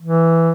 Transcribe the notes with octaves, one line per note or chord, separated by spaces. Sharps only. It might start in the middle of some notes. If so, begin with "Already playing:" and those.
E3